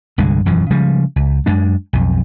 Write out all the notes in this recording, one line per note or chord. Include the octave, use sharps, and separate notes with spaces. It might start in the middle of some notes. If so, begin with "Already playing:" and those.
C2 G2 D3 G#3
E1 F#2 E3 F3
C#3 F3 G3 G#3
C#2
F#2 G#3 D4
B1 F2